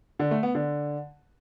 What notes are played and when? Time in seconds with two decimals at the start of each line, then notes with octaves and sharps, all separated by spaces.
0.19 D3
0.31 A3
0.43 B3
0.55 D3